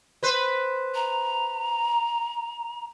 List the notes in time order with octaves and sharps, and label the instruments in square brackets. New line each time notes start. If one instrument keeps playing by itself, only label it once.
[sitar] B4 C5
[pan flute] A#5